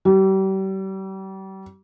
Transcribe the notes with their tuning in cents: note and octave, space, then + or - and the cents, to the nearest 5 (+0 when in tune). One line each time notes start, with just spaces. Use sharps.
G3 -35